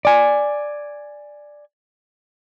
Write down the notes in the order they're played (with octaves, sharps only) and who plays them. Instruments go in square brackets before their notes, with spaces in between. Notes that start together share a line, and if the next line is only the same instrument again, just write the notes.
[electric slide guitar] D5 G#5